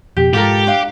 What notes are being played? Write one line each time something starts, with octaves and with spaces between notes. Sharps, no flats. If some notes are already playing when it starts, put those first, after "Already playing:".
F2 B2 G4
G#2 F4 G4 A4 A#4
D4 F5